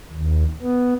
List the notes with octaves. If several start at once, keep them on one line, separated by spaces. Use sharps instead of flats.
D#2
B3